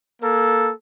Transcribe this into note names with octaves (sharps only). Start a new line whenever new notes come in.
A#3 A4